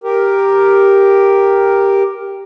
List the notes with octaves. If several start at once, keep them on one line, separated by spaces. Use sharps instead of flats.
G4 A#4